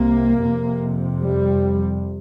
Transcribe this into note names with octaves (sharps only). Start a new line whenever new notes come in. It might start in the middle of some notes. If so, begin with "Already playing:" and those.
Already playing: C2 C3 A#3
F2 C3
G3